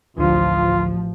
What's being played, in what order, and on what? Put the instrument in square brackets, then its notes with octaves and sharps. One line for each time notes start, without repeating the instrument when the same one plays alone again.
[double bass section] A1 F3 [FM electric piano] D2 D3 [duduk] F4